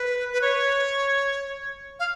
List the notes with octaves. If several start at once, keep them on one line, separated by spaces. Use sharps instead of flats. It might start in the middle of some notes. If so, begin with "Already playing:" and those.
Already playing: B4
B4
C#5
F5